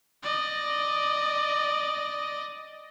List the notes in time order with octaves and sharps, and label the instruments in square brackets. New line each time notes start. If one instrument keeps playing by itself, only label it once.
[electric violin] D5 D#5